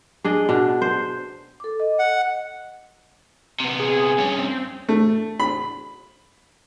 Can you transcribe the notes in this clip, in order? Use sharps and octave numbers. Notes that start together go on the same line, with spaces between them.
D4 G#4 D#5
B2 D4
C5
A4 D6
D#5
F#5
C3 B3
G#4
G2 C#4
C4
A3
B5